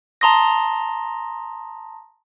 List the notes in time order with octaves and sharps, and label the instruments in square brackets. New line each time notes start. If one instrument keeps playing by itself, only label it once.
[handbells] A5 A#5 C6 D#6 A#6